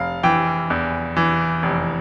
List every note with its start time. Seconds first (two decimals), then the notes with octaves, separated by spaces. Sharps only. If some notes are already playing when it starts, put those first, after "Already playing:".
Already playing: F1 F5
0.23 E3 G5
0.70 E2
1.17 E3
1.63 F1